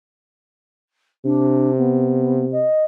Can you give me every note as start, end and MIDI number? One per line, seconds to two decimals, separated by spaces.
1.25 2.66 48
1.25 1.71 62
1.77 2.44 59
2.51 2.84 75